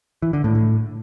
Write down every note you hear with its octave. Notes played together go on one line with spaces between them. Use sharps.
E3
D3
A2
A2